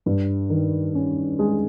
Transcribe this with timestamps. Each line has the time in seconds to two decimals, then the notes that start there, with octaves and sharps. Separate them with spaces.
0.06 G2
0.50 D#3
0.95 C#4
1.39 G#3